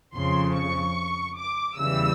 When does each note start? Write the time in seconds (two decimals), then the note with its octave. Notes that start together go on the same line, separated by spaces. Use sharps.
0.15 F2 C#3 F3 C6
0.56 C#6
1.38 D6
1.80 E2 C#3 E3 G3 E6